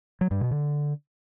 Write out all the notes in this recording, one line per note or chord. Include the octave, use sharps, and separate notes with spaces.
F#3
G2
B2
D3